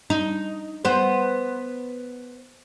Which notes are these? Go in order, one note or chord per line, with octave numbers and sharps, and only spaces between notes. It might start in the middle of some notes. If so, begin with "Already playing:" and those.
D#4
B3 C5